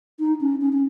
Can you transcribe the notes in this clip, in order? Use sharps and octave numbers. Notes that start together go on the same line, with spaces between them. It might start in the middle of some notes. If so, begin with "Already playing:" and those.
D#4
C#4
C#4
C#4